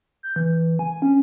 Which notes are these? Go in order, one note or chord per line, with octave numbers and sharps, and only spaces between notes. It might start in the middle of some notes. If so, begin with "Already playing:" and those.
G6
E3
G#5
C#4